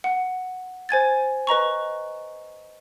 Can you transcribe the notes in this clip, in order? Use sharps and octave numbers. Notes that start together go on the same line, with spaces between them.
F#5
C5 G#5 G#6 A6
B4 D#5 A#5 C#6